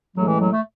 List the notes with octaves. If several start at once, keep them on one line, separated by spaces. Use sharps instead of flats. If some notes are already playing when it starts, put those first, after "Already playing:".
A1 A2 F#3 G#3
E3
F#3
A3